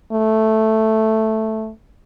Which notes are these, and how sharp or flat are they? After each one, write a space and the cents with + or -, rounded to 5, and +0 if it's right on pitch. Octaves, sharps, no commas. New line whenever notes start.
A3 +0